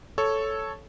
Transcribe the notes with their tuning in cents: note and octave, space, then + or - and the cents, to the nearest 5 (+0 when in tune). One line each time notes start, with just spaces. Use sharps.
A4 -5 C#5 +0